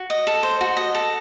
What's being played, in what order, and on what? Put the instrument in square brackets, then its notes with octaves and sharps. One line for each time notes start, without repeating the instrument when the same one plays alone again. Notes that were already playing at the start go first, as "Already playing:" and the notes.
Already playing: [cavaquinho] F#4
D#5
A4
C5
F#4
D#5
A4